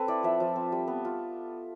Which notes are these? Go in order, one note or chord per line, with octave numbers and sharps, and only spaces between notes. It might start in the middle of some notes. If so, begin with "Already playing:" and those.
Already playing: C4 A4 B4
E4 D5
F3 E5
F3
C4
G3
B3
F4